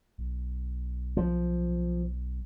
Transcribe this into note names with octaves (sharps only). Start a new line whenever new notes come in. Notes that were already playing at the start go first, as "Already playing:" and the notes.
B1
F3